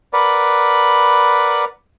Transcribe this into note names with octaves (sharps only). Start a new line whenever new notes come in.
A#4 B4 D5 F#5 B5